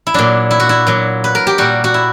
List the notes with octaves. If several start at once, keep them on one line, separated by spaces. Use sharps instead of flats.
E4
A#2 F#3 D4
E4
F#4
E4
A#2 F#3
B4
A#4
G4
A#2 G3 F#4
F#4
E4